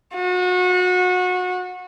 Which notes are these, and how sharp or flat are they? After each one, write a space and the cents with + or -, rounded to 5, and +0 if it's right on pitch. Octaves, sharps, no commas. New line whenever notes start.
F#4 -30